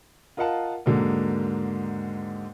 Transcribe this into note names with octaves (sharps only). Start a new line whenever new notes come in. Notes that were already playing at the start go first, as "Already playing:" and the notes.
F4 A#4 D#5 F5 F#5 A5
D#2 G#2 D3 F#3 G#3 A#3